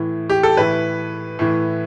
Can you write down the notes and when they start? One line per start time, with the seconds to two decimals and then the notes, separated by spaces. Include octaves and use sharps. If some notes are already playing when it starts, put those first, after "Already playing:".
Already playing: A2 E3
0.30 G4
0.43 A4
0.57 A2 E3 B4
1.39 A2 E3